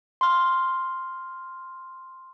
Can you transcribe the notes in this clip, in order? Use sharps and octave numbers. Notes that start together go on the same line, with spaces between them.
C6 F6